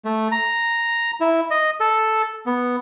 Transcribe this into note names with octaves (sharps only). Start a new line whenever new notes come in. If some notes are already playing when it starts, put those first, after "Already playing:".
A3
A#5
E4
D#5
A4
B3